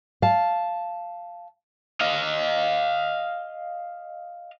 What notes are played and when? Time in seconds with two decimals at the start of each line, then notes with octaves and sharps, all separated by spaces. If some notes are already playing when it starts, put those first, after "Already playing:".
0.22 F5 A5
2.01 D#5 F5